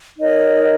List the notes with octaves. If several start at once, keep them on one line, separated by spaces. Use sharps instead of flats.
D#4 A#4 C#5 D#5